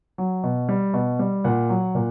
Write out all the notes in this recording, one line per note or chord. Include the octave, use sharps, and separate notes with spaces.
F#3
B2
G3
B2
G3
A#2 F#5
F#3
A#2